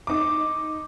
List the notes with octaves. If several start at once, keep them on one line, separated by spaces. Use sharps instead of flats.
D#4 D6